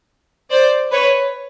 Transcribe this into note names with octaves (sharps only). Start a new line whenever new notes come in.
C5 D5
B4 C#5